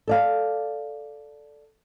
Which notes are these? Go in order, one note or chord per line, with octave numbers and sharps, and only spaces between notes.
A4 D5 F5